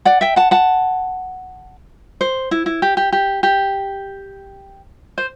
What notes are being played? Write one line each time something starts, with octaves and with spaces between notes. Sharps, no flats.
D5 F#5
E5 G5
F#5 A5
F#5 A5
C5
E4
E4
G4
G4
G4
G4
C5